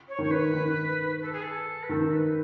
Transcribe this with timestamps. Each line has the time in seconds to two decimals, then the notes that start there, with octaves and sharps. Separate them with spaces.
0.08 C#5
0.19 D#3 C#5
0.30 B4
0.54 D#3
1.21 A4
1.32 G#4
1.42 A4
1.82 B4
1.89 D#3 A4
2.12 B4